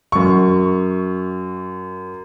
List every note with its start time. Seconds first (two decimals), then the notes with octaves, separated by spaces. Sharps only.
0.12 F#2 C#6